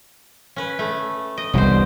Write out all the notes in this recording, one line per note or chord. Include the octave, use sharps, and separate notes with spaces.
C#4 B4
A3
D#5
E1 C2 B2 G3 C5